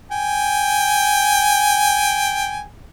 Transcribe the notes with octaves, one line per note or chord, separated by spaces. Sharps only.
G5 G#5